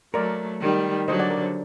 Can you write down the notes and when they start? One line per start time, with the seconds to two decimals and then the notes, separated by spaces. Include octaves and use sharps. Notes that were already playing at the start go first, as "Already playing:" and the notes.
0.14 F#3 A3 A#4 D5
0.60 D#3 G3
1.07 D3 F#3 C5 D#5
1.19 D5 F#5
1.30 A#4 D5
1.43 C5